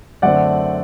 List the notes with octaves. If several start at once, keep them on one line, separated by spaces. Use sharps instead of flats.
F#2 D3 A3 C4 D5 F#5